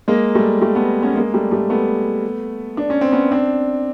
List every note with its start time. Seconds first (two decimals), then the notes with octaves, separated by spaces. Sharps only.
0.08 G#3 A#3
0.35 G3 A3
0.61 G3 A3
0.75 A3 B3
1.03 B3 C#4
1.16 G#3 A#3
1.34 G3 A3
1.51 G3 A3
1.70 A3 B3
2.77 D4
2.90 C#4
3.01 C4
3.12 B3 C#4
3.32 C4 D4